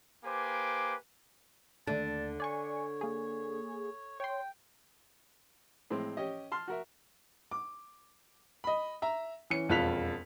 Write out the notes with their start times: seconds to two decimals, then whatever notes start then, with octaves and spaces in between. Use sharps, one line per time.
0.24 A#3 G4 B4 C5 G#5 D6
1.87 D#2 D3 A3 D4 A5
2.40 C#5 D5 G#5 C#6
3.01 A#3 G#4
4.20 C#5 G5 C6
5.90 A2 G#3 C4
6.17 C#4 G4 D#5
6.52 A5 C6 F6
6.68 F#4 A#4 E5
7.51 D6
8.64 D#5 B5
9.02 E5 A#5
9.50 E3 C#4 C#7
9.69 E1 F2 F4 F#6 B6 F7